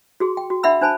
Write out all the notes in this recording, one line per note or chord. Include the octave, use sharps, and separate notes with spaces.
F#4 G#4 C6
G5
F#4
D4 E5 F#5 B5 E6
D4 C5 G#5 A5 B5